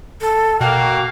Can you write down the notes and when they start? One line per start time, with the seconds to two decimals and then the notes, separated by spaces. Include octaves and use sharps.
0.21 A4
0.61 B2 A#3 F#4 F5 G5